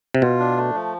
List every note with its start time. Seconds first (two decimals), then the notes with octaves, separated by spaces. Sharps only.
0.14 C3
0.22 B2 F4
0.40 D4
0.57 A3
0.75 F3